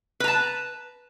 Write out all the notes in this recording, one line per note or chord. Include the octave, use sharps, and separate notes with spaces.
B4 A5 A#5